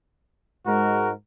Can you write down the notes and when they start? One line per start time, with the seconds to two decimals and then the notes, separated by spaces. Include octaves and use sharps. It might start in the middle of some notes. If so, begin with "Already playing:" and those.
0.66 G#2 G#3 F#4 A#4